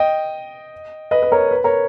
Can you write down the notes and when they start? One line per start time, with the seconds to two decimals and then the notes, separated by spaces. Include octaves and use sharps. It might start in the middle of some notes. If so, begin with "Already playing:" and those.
Already playing: D#5 G5
1.11 B4 D#5
1.22 B4
1.32 A#4 C#5
1.51 B4
1.64 A#4 C#5